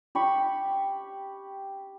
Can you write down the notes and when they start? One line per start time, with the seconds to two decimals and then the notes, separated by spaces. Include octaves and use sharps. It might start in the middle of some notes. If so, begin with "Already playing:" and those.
0.15 G4 B5 C#6